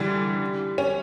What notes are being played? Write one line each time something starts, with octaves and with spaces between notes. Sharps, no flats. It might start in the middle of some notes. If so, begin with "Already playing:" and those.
Already playing: D3 E3 G3
C#4